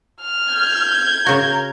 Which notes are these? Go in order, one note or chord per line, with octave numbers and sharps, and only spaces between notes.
F6
G6 G#6
C#3 F#4 A#4